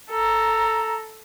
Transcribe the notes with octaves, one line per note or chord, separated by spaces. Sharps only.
A4 A#5